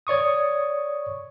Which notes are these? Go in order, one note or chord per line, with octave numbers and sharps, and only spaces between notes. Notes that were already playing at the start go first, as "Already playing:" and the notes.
C#5 D5 C#6 D#6